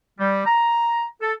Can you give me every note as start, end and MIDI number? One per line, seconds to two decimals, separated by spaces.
0.19 0.42 55
0.45 1.04 82
1.22 1.32 69